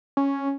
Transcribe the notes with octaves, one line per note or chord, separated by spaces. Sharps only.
C#4